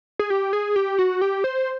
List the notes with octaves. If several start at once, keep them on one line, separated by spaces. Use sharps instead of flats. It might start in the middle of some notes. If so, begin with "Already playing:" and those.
G#4
G4
G#4
G4
F#4
G4
C5